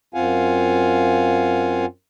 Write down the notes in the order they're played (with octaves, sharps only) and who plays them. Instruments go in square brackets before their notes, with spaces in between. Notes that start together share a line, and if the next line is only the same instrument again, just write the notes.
[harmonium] F#2 C4 F4 F5 F#5 G#5